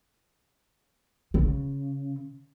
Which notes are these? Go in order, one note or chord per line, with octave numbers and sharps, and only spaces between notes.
C#3